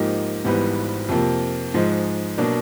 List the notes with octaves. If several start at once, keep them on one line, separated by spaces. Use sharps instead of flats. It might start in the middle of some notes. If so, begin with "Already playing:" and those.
Already playing: G#2 F3 A#3 D#4 G4
G#1 G#2 E3 G3 B3
F2 C3 F3 A#3
G#2 F3 G#3
B2 F#3 A#3 D4